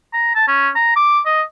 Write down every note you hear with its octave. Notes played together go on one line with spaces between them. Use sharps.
A#5
A5
C#4
A#5
D6
D#5